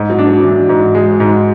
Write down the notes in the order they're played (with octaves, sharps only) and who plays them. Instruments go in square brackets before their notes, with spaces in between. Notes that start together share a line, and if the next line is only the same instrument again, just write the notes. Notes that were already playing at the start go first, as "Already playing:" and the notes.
Already playing: [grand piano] G#2
[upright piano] F#3
[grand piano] D4
[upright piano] F#3
[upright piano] E3 [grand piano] D4
[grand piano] G#2
G#3
G#2